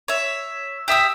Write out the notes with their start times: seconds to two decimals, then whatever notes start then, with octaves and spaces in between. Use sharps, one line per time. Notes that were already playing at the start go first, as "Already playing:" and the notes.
0.08 C#5 E5
0.88 G4 E5 D#6 E6